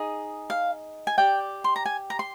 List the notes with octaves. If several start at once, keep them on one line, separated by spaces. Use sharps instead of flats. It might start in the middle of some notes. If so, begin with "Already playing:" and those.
Already playing: D#4 G#4
F5
G#5
G4 D5 G5
C6
A#5
G#5
A#5
C6